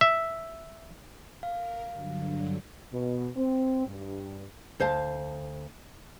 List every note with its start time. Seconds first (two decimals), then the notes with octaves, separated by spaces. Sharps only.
0.01 E5
1.43 A#4 F5
1.91 G2 D3 F#3
2.93 B2
3.37 C4
3.87 G2
4.80 D2 C5 F5 A5